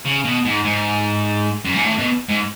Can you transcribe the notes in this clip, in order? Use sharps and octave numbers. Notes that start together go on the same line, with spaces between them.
C#3
B2
G#2
G#2
F#2
G#2
A2
B2
G#2